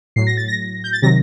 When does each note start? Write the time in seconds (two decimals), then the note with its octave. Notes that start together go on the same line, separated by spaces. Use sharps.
0.16 A2 F#3 C7
0.27 A#6
0.37 A6
0.48 A#6
0.84 G6
0.93 A6
1.02 C3 D#3 F#3 A#6